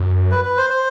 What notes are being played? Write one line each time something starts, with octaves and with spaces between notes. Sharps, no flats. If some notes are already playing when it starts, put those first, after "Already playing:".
Already playing: F#2
B4
B4
C5
C5